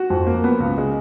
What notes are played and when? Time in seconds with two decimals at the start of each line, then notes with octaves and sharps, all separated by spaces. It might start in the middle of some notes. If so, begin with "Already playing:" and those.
Already playing: F#4
0.10 F2
0.27 A#3
0.44 B3
0.60 C#2
0.78 G#3